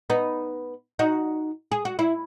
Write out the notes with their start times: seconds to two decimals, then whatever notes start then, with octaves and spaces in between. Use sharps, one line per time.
0.10 B3 D#4
0.99 D#4 F#4
1.72 G#4
1.85 F#4
1.99 E4